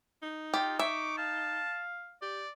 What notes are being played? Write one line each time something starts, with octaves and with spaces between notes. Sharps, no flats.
D#4
F4 G4
E5 C#6 D6
F5 A5
G4 D5